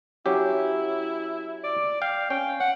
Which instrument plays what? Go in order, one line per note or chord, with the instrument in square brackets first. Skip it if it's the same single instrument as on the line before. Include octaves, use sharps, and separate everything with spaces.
[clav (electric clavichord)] F#3 C#4 G4 [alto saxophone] E4
[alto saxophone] D5
[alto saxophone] F5 [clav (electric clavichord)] G5
[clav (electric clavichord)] C#4 [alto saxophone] G5
[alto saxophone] F#5